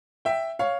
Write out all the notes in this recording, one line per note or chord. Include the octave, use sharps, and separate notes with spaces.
E5 G5
C#5 F5